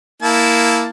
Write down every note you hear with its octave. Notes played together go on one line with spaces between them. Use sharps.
A#3 E4 A5